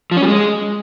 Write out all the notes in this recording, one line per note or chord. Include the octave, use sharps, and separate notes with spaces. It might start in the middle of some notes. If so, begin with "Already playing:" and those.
F3
C#4
G3
G#3